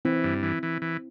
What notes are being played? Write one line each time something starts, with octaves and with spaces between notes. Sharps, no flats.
E3 C4 E4
G2
E3
E3
E3